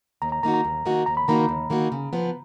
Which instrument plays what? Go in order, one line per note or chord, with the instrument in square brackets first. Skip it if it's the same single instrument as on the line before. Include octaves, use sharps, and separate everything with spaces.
[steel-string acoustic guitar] D#2 [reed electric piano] A#5
[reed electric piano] A#5
[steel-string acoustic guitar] D#3 A#3 D#4 F#4 [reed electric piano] A#5
[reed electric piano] A#5
[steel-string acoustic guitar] D#2
D#3 A#3 D#4 F#4
[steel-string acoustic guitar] D#2 [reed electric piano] A#5
[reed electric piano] B5
[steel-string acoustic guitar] D#3 A#3 D#4 F#4 [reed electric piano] A#5
[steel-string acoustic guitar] D#2
D#3 A#3 D#4 F#4
C#3
F3 B3